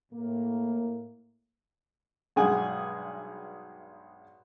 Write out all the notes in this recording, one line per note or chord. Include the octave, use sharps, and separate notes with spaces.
A2 A#3
B1 G2 G#3 G#4 F#5 G#5